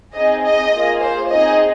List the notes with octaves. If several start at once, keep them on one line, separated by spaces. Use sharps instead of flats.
C4 D#4 G#4 D#5
D#5
A#3 F4 G#4
C5
C4 D#4 G#4 D#5